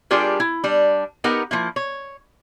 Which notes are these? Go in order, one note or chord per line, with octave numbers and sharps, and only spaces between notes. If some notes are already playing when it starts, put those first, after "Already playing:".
G3 D4 F4 G4 G#4 A#4
E4
G3 D4
B3 D#4 G4 A#4 F#5
F3 A#3 E4
C#5